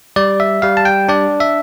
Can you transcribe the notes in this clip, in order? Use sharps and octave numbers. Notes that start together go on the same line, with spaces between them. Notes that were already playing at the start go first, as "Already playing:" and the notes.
G3 D5
E5
G3 F5
A5
G5
D4 D5
E5